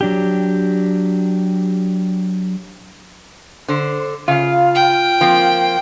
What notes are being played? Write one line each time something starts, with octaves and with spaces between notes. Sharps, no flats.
F#3 D4 G4
D3 C5
C#3 F4 F5
G5
F3 A#3 C4